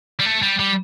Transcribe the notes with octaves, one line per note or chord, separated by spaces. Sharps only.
G3
A3
G3
G3